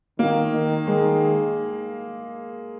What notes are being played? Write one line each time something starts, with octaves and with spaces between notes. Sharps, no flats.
D#3 A#3
D#3
D#3 G#3